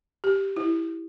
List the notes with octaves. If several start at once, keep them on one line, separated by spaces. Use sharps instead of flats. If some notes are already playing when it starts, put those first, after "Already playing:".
G4
E4